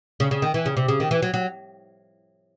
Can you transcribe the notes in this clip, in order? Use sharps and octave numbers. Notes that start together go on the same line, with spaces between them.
C#3
C#3
D#3
E3
C#3
C3
C#3
D#3
E3
F#3
F#3